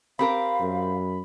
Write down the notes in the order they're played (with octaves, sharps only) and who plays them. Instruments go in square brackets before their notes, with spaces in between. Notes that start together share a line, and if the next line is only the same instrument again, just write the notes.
[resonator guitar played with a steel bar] C4 G4 A#4 [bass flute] F5 [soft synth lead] B5
[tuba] F#2